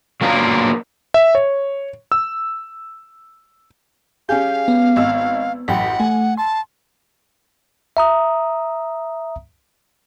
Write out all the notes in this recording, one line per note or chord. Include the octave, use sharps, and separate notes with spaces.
F#3 A#3 B3 D4 F4 A#4
E5
C#5
E6
C#4 G4 G#4 F5 G6
B3
G#1 D#5 E6
A1 F#2 F#5 G5 B5 B6
A3 G#5
A5 C6
E5 A#5 D#6